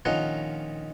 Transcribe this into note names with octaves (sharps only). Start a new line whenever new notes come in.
A#1 D#3 C#4 D#4 F4 F#5